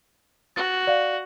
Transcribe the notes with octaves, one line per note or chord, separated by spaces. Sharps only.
F#4 A6
D5 F5